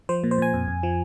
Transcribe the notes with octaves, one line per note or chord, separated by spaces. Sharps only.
F3 C5
A#2
C5
A#2 G#5
F2
F2
F3